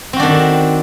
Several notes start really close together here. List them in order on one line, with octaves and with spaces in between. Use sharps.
C4 F#4 D4 D#3